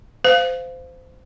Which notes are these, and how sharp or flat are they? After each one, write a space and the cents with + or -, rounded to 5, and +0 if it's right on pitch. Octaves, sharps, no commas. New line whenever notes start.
C5 -20 F5 +0